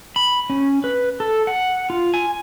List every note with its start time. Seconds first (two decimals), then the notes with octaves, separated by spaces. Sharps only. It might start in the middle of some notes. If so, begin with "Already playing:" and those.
0.16 B5
0.50 C#4
0.84 B4
1.20 A4
1.47 F#5
1.90 F4
2.14 G#5